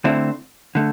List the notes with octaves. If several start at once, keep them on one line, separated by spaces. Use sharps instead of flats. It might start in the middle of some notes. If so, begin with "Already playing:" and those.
D3 A3 C4 E4
D3 A3